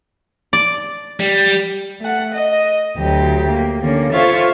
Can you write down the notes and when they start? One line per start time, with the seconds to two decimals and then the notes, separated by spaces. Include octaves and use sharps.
0.53 D5
1.20 G3
2.00 A3 F#5
2.33 D#5
2.96 D2 F#3 G4
3.50 A#3
3.81 D3 A#3 C#4
4.12 F4 A4 C5 C#5 E5 F5